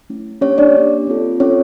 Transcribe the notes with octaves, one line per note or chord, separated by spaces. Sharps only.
A3 C#4 E4
A#3 C#4 D4 G4 C#5
D4 D5
A#3 D4 G4
C4 F4 A4
C4 C#4 F4 A4 C#5